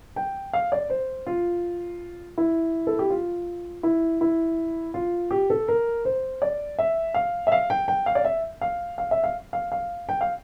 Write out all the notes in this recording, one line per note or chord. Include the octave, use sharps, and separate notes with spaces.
G5
F5
D5
C5
F4
E4
A4
G4
F4
E4
E4
F4
G4
A4
A#4
C5
D5
E5
F5
E5
F5
G5
G5
F5
D5
E5
F5
F5
E5
F5
F5
F5
G5
F5